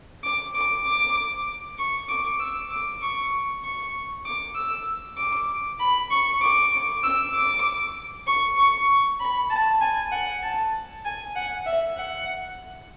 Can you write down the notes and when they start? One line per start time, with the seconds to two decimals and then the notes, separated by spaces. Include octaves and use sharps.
0.23 D6
0.55 D6
0.85 D6
1.78 C#6
2.09 D6
2.40 E6
2.71 D6
3.01 C#6
3.63 C#6
4.25 D6
4.55 E6
5.17 D6
5.79 B5
6.10 C#6
6.41 D6
6.72 D6
7.03 E6
7.34 D6
8.27 C#6
8.57 C#6
9.20 B5
9.50 A5
9.81 G#5
10.12 F#5
10.43 A5
11.05 G#5
11.36 F#5
11.66 E5
11.97 F#5